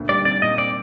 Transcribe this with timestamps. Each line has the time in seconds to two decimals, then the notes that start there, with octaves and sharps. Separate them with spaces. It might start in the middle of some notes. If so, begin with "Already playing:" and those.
Already playing: D2 A#2
0.09 G3 D5
0.25 C3 D5
0.42 A#2 D#5
0.58 C4 D5